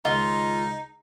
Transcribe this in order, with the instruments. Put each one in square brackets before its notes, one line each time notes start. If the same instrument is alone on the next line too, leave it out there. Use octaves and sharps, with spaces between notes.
[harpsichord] C#2 D#3 [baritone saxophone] D#4 [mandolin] F4 [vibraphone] D#5